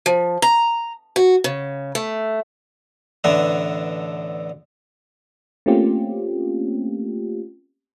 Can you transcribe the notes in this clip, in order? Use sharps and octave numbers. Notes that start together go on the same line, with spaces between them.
F3
A#5
F#4
C#3
A3
A1 D3 B3 D4 E5 A#5
A3 A#3 C4 C#4 F4 G4